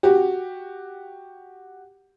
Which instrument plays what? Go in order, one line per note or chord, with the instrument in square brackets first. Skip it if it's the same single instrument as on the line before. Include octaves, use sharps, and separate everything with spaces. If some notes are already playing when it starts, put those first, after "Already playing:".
[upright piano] F#4 G4